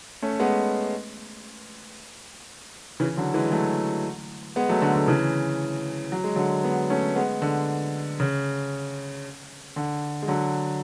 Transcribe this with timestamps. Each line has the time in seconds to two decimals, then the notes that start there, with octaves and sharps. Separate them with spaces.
0.22 A3 C#4
0.39 G#3 B3
3.00 C#3 E3
3.17 D3 F#3
3.34 E3 G#3
3.52 F#3 A3
4.56 G#3 B3
4.69 F#3 A3
4.82 D3
4.95 D3
5.08 C#3 E3
6.12 F#3
6.24 G#3
6.36 D3 F#3
6.64 G#3 B3
6.90 A3 C#4
7.16 G#3 B3
7.42 D3
8.20 C#3
9.76 D3
10.22 G#3
10.28 D3 F#3